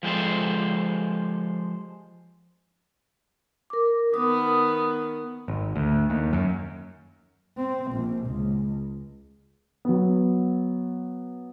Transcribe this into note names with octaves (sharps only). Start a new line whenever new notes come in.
F3 G#3 G4 A4 C5
A#4 D6
D#3 B3 D#6
G#1
D2
D#2
F#2
C4
A#1
C#2
F#3 B3